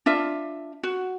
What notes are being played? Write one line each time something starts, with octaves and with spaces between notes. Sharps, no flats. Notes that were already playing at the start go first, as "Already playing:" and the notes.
D4 F4 E5
F#4